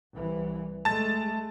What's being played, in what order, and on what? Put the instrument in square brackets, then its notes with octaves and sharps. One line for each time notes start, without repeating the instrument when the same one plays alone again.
[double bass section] C2 E3
[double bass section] G#3 A3 [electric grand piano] A5 A6